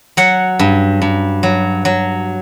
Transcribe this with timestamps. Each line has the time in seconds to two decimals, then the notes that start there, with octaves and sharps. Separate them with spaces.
0.17 F#3 F#5
0.59 G2
1.02 G2
1.43 F#3
1.85 F#3